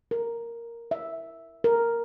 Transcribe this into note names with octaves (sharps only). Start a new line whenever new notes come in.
A#4
E5
A#4